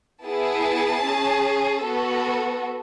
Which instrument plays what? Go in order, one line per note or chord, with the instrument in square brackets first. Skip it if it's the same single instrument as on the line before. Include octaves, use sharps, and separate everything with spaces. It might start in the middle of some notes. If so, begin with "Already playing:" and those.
[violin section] B3 E4 G#4 A5
C#4 G#4
B3 F#4 A4